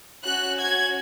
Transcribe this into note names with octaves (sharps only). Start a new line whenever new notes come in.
C#4 F#4 F#6
G#6